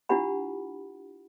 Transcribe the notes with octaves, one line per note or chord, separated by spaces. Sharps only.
D4 E4 F4 G4 F#5 B5